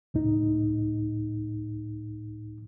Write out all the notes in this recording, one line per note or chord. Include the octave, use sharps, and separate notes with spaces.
C#2 A2 D#4